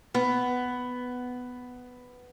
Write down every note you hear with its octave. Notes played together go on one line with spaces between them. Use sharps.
B3